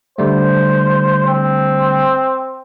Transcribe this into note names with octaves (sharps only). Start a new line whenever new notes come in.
D3 G3 A3 C5
C4